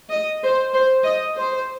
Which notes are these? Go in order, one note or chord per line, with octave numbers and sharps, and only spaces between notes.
D#5
C5
C5
D#5
C5